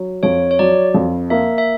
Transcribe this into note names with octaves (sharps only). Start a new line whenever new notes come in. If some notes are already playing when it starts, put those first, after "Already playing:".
Already playing: F#3
F2 C#5
C#5
F#3 D5
F2
A#3 E5
E5